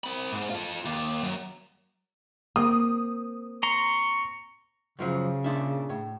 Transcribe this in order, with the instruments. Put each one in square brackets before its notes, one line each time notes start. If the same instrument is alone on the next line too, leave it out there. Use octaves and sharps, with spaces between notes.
[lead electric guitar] C4 B5
G#2
F4 A4
D#2
F#2
[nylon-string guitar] A#3 C4 [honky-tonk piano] D#6
[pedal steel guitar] A#5 C6 [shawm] C#6
[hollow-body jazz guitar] F#2 F3 F#3 [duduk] C#3
[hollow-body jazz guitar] A#2 D4 E5
A2